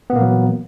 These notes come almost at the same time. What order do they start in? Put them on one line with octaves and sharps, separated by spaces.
B3 A#2 A#3 E3 F#3